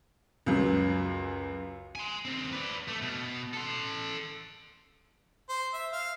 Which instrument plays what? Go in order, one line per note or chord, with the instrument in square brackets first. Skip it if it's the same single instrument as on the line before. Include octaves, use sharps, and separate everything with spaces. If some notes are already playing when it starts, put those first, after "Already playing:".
[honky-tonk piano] C#2 F#2
[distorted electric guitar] G#5 C6
D#2 C4
B4 D5
A3
B2
A4 C6
[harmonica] C5
E5
F5